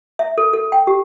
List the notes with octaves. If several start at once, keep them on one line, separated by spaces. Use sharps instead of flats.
E5
A4
A4
G5
G4